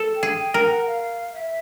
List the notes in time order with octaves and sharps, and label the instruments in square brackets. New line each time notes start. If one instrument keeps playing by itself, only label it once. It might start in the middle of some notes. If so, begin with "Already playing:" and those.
Already playing: [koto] A4
[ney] G5
[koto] G#4
[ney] G5
[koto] A#4
[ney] F#5
F5
E5